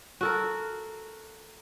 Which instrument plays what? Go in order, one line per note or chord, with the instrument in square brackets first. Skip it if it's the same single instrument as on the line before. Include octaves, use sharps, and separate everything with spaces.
[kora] F#4 A4 A#4